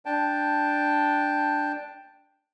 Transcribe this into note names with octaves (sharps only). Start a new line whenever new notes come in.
D4 G5 A5